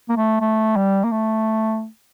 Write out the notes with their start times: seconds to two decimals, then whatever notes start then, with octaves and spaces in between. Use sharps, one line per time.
0.09 A#3
0.17 A3
0.41 A3
0.76 G3
1.04 A#3
1.12 A3